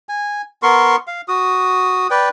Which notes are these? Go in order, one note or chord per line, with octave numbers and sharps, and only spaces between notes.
G#5
B3 A#4 C6 C#6
F5
F#4 D#6
B4 D5 G5